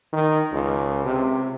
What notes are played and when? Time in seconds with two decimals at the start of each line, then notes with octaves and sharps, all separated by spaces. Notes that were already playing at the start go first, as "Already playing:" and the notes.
0.13 D#3
0.53 C#2
1.05 C3